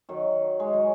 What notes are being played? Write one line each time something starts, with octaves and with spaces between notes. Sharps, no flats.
D#3 F#3
G#3
F#3